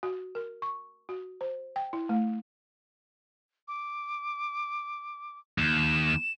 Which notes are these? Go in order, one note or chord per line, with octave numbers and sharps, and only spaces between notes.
F#4
A#4
C#6
F#4
C5
G5
E4
A3
D6
D#2 E7